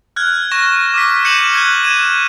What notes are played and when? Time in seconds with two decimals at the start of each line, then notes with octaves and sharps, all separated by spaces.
0.16 F6 F#6 G#6
0.51 C#6 A#6 E7
0.94 D6 F6 B6
1.25 G6 C#7 D#7 E7 F#7
1.53 F#6 G#6 G7
1.83 G#6 D#7 E7